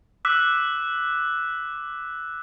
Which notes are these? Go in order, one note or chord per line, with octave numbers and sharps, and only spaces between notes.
D6 E6 F#6 B6